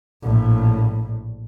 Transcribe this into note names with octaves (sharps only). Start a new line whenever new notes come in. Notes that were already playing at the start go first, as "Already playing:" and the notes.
A#1 A2